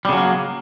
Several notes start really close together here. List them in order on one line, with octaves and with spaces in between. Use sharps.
G3 C#3 F#3 A#3